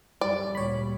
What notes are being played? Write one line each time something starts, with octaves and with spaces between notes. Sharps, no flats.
F#2 G3 D5
D2 A#2 G3 C#5 B5